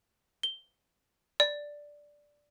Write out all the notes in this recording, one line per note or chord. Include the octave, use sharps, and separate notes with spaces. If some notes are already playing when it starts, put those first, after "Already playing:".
G7
D5